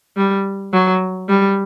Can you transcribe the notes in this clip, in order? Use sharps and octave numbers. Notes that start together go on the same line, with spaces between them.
G3
F#3
G3